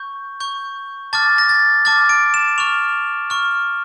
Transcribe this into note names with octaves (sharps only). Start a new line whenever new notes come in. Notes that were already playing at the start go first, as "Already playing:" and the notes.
Already playing: C#6 G6
C#6 G6
A5 D6 F6 A6
A#6
A6
A5 D6 F6 A6
D7
E7
C#6 F6 F7
C#6 F6